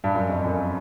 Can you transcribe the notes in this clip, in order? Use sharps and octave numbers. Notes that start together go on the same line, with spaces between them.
G2
F#2
F2
F#2